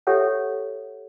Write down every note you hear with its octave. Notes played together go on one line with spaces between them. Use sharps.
G4 A4 C#5 E5 F#5